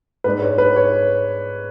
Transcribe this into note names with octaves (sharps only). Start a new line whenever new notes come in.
G#2 G#3 D4 B4
C#5
B4
C#5